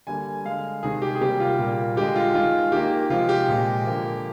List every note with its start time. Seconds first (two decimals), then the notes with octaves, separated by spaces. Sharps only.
0.07 D3 G3 A#3 G#5
0.45 D3 G#3 F5
0.83 C3 D#3 G#3 G#4
1.02 G4
1.15 G#4
1.21 C3 G3 A#3 G4
1.40 F4
1.59 A#2 G3 A#3
1.96 D3 G#3 G4
2.15 F4
2.34 D#3 G#3 F4
2.72 D#3 A#3 G4
3.10 C3 F3 G#3 F4
3.29 G4
3.49 A#2 G#3
3.86 D3 F3 A#3